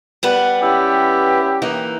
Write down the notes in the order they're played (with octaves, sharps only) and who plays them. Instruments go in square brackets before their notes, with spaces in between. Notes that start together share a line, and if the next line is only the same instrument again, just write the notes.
[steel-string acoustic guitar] G3 B3 B4
[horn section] C#4 E4 G4
[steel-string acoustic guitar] E3 A#3 D#4